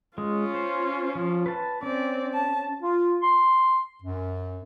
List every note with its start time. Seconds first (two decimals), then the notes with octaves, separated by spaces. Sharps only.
0.18 G#3 C#4 F4
0.54 C5
1.15 F3
1.46 B4 A5
1.83 C4 C#4 D5
2.34 A5
2.83 F4
3.22 C6
4.03 F#2